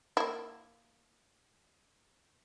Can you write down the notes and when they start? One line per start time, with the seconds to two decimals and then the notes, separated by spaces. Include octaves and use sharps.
0.17 A#3 E4